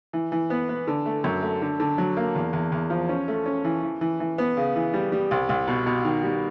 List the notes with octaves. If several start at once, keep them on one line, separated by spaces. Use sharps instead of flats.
E3
E3
B3
B3
D3
A3
F#2
A3
D3
D3
F#3
A#3
E2
E2
E2
F3
C#4
A3
C#4
E3
E3
E3
E3
B3
C#3
E3
G3
G3
C2
C2
B2
B2
D#3
G3